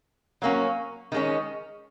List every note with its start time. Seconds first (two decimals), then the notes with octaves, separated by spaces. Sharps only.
0.42 F#3 A#3 C#4
1.12 D#3 G#3 C#4